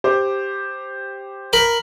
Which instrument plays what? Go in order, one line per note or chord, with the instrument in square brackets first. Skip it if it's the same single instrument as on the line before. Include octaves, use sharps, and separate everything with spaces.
[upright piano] G4 C5 D6
[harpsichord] A#4 B5